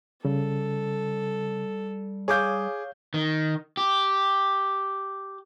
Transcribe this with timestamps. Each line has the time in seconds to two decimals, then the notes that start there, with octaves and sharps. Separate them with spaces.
0.25 C#3 G3 A4
2.28 G#4 C#5 F5 D6 G6
3.14 D#3
3.77 G4